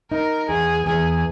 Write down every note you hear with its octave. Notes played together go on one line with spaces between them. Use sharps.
D#4 A#4
E2 G#4
E2 G#4